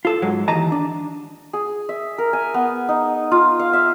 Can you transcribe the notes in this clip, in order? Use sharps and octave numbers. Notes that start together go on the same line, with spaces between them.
F4 A4
G#2 F#3 G#3
D#2 E3 D#5 A5 A#5
D4
G#4
E5
A#4
G#5
B3
D#4
F4
F5
E5